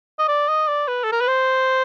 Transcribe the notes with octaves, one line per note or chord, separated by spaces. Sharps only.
D#5
D5
D#5
D5
B4
A4
A#4
B4
C5